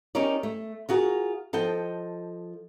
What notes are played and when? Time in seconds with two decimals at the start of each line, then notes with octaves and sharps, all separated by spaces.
0.15 C#4 D#4 G4 A#4 C#5 D5
0.43 A3
0.89 F4 F#4 G#4 A#4
1.53 F3 A4 D#5 G5